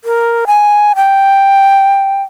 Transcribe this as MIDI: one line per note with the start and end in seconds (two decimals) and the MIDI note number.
0.04 0.45 70
0.47 0.93 80
0.96 2.22 79